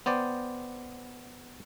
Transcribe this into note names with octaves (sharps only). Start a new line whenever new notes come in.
B3 C5 D5 G5